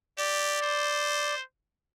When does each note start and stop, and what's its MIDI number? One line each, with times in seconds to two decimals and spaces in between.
0.18 0.58 67
0.18 1.35 74
0.62 1.42 72